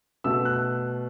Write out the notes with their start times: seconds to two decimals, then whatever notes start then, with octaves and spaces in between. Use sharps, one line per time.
0.24 B2 A3 E6
0.45 F#6